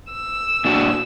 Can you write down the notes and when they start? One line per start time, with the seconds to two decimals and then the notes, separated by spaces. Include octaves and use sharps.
0.12 E6
0.65 A#2 D4 F#4